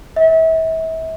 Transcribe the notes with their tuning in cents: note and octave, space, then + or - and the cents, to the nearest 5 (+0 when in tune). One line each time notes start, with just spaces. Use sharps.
E5 -35